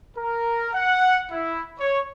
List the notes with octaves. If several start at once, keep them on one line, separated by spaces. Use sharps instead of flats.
A#4
F#5
E4
C#5